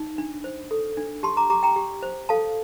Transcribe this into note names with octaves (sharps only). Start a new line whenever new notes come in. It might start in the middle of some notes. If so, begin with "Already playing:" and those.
Already playing: D#4
D4
C5
A4
D4
G4 A5 C6
A#5 D6
G4 A#5 D6
G5 A#5
G4
C5
A4 F5 A5